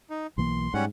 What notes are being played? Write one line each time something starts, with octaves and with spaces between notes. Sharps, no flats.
D#4
B1 E3 A#3 C6
G#2 G3 C#4 F#5